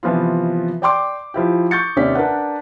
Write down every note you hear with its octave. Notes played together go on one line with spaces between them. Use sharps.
C3 E3 F3 B3 F4
D5 G5 C6 D6
F3 E4 G4
C#6 G6 A6 C#7
D#2 C3 C#4 D5 B6
D4 A#4 B4 F#5